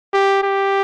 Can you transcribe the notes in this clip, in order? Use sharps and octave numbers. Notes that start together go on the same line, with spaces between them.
G4
G4